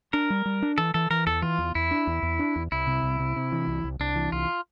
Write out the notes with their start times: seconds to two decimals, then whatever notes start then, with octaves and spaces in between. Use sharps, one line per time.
0.13 D4 A#4
0.30 G3
0.46 G3
0.62 D4
0.78 E3 A4
0.94 E3 A4
1.10 E3 A#4
1.27 E2 A4
1.42 E3 F4
1.58 E2
1.75 E2 E4
1.91 D4
2.07 E2
2.23 E2
2.39 D4
2.56 E2
2.72 C2 E4
2.87 C3
3.03 C2
3.20 C3
3.36 C3
3.52 E3
3.68 C2
3.84 C2
4.00 C2 D4
4.16 E3
4.32 C2 F4